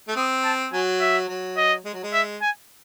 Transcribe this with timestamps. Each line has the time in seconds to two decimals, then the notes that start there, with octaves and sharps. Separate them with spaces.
0.08 A3
0.16 C4 D#6
0.44 A5
0.72 F#3 G#5
1.01 E5
1.28 F#3
1.57 D#5
1.85 G#3
1.94 F#3
2.03 G#3
2.13 E5
2.42 G#5